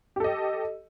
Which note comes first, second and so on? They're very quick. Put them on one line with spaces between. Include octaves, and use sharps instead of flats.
G4 A4 D#5